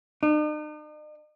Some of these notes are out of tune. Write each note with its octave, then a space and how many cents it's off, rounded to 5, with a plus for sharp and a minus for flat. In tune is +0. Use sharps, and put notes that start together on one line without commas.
D#4 -45